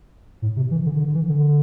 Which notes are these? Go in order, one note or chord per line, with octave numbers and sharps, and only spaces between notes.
A2
C3
E3
D3
D3
E3
D3